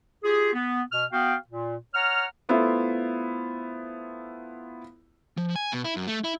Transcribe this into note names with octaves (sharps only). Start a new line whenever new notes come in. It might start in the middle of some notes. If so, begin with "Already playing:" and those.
F4 G4 G#4
B3
B2 F6
B3 F#4 F5 G5
A#2
C#5 F#5 A#5 F6
A3 B3 E4 F4 C5 E5
F3
G#5
B2
E4
F#2
A3
E4